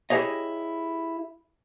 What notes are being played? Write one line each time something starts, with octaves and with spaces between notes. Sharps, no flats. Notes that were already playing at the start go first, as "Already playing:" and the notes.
E4 G4 G#4 C#5 D#5